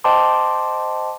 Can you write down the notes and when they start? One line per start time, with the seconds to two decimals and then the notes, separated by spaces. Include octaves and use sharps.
0.04 C5 D#5 G5 A5 C6 D6